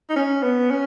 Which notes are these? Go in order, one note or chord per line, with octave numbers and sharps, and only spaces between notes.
D#4
C#4
B3
C#4